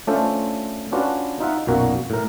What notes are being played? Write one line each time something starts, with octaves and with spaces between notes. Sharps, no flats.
A3 C#4 D4 F4 A4 C5
C#4 D4 F4 F#4 B4
D#4 F4 E5 F#5
B1 F#2 A#2 F#4 A#4 F5
A2 A#4